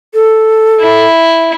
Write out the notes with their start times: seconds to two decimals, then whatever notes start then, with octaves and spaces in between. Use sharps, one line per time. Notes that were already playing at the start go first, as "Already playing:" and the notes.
0.14 A4
0.80 E4